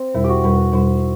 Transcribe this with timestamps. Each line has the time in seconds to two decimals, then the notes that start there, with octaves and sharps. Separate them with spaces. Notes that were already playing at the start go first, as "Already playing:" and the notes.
Already playing: C4
0.15 E2 B2 G3 E4
0.24 F#4 G4
0.44 E2 B2 G3 B4
0.58 B4
0.73 E2 B2 G3 C5